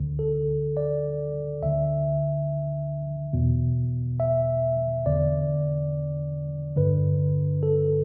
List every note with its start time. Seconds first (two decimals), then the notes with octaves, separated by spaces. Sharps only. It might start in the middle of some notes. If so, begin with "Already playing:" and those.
Already playing: D2 D3
0.19 A4
0.77 D5
1.62 D2 D3 E5
3.33 E2 B2
4.20 E5
5.06 E2 D3 D5
6.76 G2 D3 B4
7.63 A4